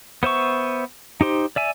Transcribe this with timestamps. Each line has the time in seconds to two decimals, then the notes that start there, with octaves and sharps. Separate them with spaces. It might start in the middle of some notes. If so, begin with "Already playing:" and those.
0.23 B3 C5 E5 C#6
1.21 D#4 G4 C5
1.56 D5 E5 G#5